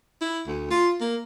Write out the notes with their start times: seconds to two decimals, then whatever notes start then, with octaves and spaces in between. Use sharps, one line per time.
0.21 E4
0.47 D2
0.71 F4
1.01 A#3